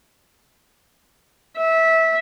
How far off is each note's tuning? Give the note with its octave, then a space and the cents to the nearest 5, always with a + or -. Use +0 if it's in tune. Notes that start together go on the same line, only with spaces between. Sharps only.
E5 -20